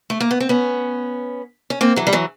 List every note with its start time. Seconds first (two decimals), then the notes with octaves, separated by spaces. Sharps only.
0.10 A3
0.20 A#3
0.31 B3
0.40 C4
0.49 B3 C#4
1.70 C#4
1.81 A#3 C4
1.96 E3 F#3
2.07 G3
2.13 E3 F#3